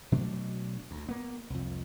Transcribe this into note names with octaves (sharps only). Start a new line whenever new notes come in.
B2 F#3 A3 D4
D2
A#3 B3
C2 F2